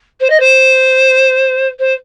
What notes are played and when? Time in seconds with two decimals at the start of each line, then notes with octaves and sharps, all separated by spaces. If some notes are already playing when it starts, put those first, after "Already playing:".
0.20 C5
0.30 D#5
0.40 C5
1.79 C5